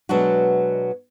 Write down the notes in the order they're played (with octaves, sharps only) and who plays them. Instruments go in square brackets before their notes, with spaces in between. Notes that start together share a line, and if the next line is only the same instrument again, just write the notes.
[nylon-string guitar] B2 F#3 G#3 D4 F#4